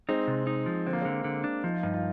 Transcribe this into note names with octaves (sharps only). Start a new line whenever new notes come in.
G#3 C4 D#4
C3
D#4
F3
D3 C4
A#3
D3 G#3 C4
D3
D4
F3 D#4
F4
G2 D#4
F4